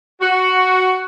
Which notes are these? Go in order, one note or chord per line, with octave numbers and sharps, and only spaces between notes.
F#4